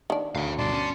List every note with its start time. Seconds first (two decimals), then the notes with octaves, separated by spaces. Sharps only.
0.10 D#3 D4
0.35 D2 C#5 F5
0.58 G2 B2 D5 A5 C6
0.72 C#4